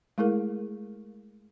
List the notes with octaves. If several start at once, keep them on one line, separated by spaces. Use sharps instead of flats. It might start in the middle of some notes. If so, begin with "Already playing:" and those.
G#3 A3 E4 G#4 A#4